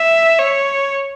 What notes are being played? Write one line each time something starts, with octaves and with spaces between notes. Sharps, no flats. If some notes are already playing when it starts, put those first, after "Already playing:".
Already playing: E5
C#5